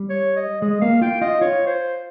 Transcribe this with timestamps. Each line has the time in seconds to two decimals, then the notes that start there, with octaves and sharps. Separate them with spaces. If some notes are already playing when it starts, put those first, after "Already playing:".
Already playing: G3
0.10 C#5
0.36 D#5
0.61 G#3 D#5
0.81 A#3 F5
1.01 F4 G5
1.21 F4 D#5
1.41 F4 C#5
1.67 C5